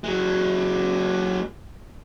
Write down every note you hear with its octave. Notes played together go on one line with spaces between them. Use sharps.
F#3 G#3